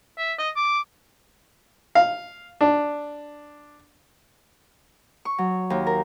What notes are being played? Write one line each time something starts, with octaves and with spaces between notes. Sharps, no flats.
E5
D#5
D6
F5
D4
C#6
F#3
D#2
A#4